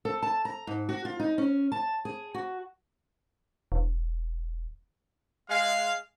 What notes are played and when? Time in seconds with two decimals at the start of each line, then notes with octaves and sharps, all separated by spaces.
0.05 A4
0.22 A5
0.45 A#5
0.67 G#2
0.89 F#4
1.05 F4
1.20 D#4
1.38 C#4
1.72 A5
2.05 G#4
2.34 F#4
3.72 E1
5.50 G#3 F5